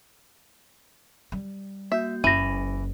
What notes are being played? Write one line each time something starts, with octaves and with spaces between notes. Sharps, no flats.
G3
A#3 F#4 E5 G6
F#1 E3 C#4 A#6 D#7